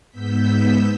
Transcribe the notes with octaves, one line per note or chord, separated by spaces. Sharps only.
G#2 B3 E6 G6 B6